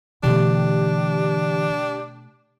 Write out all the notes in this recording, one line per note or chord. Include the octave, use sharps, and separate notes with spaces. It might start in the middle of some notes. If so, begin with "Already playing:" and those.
B2 D3 E3 A3 D4 G4